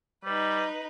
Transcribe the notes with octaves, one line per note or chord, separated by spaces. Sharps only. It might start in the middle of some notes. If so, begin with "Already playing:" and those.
G3 D#4 B4